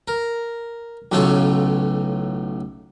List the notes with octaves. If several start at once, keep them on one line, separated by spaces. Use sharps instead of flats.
A#4
B1 A2 C#3 F4 A4 C#6